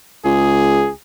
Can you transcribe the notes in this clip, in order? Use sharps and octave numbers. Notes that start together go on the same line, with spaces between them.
C#2 G#4